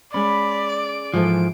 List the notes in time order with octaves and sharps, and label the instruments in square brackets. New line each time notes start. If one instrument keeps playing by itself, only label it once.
[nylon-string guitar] G#3 C#4 [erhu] D5 [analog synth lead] B5
[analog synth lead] D7
[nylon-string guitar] G#2 E3 A4 [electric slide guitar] F3